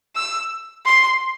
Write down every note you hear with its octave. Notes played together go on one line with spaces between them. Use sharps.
E6
C6